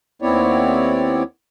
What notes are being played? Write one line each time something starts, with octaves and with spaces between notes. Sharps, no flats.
D#2 B3 C4 E4 C#5 D5